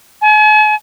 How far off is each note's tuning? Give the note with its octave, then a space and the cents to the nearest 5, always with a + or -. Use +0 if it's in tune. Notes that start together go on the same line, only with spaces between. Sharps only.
G#5 +45